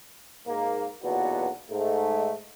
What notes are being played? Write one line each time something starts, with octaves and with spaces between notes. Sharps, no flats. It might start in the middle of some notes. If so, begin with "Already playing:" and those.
G#2 A#3
B1 E2 A#2 B3 D4 F#4
G#2 A3